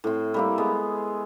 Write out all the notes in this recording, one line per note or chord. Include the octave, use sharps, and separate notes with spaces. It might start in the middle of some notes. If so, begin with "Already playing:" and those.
A2 C4
G3 A#3 E4
G#3 B3